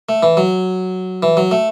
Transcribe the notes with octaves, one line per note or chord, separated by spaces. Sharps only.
A3
E3
F#3
E3
F#3
A3